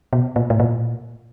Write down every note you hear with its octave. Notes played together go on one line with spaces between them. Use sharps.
B2
A#2
A2
A#2